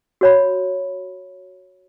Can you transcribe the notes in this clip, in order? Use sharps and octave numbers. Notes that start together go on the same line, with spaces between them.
F#4 C#5 B5